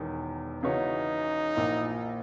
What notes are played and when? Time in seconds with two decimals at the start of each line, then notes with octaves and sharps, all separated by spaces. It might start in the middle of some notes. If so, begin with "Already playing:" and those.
Already playing: E1 E2 D#3
0.63 C#3 E3 B3 D#4 F#4 C#5
1.55 A#1 A#2 A#3 E4